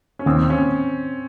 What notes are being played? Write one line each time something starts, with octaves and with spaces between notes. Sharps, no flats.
C#4
D#2 C4
C#4